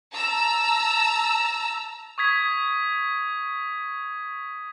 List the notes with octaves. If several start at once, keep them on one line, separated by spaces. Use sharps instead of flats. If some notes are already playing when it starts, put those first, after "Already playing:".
A5 A#5 E6
C#6 D#6 G#6 B6